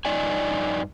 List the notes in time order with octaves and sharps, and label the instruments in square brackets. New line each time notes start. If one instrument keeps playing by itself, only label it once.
[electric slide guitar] G2 D#4 D5 G#5